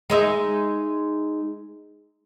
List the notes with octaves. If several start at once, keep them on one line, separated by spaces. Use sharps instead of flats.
G#3 D#4 E5